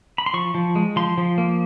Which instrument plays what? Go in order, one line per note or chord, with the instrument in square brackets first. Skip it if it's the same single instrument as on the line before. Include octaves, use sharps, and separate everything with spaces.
[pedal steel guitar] B5
C6
F3 C#6
F3
G#3
F3 C6
F3
A#3